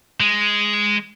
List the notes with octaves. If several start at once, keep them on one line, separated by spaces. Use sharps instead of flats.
G#3